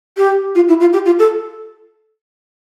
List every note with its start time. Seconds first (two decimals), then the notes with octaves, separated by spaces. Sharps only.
0.17 G4
0.55 F4
0.68 E4
0.80 F4
0.93 G4
1.06 F4
1.19 A4